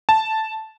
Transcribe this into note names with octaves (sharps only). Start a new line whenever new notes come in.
A5